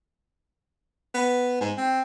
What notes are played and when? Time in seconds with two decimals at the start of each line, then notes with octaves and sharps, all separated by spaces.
1.14 B3
1.61 G#2
1.77 C4